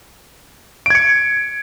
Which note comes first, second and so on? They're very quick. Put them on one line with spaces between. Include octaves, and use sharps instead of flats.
D7 G#6 C#7